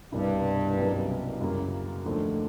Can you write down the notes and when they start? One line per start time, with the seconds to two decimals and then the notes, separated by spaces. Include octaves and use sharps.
0.12 C2 G2 B2 G3 A#3 D4
0.77 C2 B2 F#3 A#3 C#4
1.41 F#2 C#3 F#3 A#3
2.05 D#2 D3 F3 A3